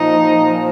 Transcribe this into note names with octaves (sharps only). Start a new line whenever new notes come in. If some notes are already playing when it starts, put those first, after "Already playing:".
Already playing: A#2 F3 D#4